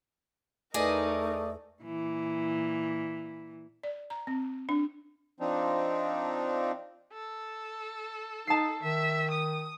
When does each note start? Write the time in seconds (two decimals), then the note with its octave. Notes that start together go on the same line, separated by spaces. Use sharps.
0.74 E2 A3 D#4 G#4 A#4 B4 D5 D#5
1.83 A#2 E3
3.83 D5
4.10 A#5
4.27 C4
4.69 D4
5.40 F3 C4 D4 D#4
7.13 A4
8.47 D#4 A5 C7
8.83 D#3 E5
9.31 D#6